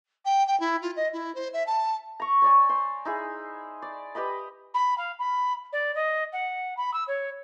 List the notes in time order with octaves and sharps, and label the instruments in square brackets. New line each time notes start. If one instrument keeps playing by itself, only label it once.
[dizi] G5
G5
E4
F4
D#5
E4
C5
E5
A5
[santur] A#5 C#6
C#5 D5 G#5
C5 C6
D#4 E4 G#4
D5
G4 B4 D#5 B5
[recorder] B5
F5
B5
D5
D#5
F#5
B5
E6
C#5